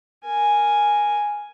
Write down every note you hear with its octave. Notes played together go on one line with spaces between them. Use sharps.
A#4 G#5